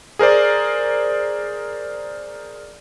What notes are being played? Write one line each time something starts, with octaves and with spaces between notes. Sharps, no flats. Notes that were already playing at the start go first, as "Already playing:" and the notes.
G#4 A#4 C5 D5